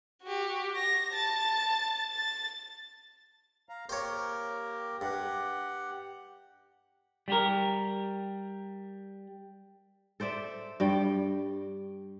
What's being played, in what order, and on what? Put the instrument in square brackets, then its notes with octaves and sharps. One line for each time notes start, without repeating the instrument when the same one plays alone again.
[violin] F#4 G4
A#6
A5 A6
A6
[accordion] F5 A#5
[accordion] A#3 G4 A#4 [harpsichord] C5 C#5
[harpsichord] G2 [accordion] G4 F#5
[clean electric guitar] G3 G4 A#4
[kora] A4 C5 D5 E5
G2 G3 G5